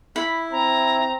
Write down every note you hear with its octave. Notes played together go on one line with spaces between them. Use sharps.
E4 B5
C4 A#5